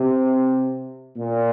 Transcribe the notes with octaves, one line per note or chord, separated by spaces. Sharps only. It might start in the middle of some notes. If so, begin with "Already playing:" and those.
Already playing: C3
A#2